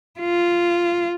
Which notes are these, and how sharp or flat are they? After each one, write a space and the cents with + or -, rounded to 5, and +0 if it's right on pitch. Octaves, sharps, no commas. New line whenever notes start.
F4 -10